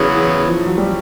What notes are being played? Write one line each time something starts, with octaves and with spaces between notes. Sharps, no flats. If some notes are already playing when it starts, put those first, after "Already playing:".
Already playing: E2 C#3 F#3 B3
E3
F3
F#3
G3